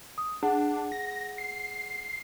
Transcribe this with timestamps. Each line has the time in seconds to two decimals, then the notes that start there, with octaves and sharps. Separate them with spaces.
0.18 D#6
0.43 D4 G#4 F#5
0.92 A#6
1.38 C7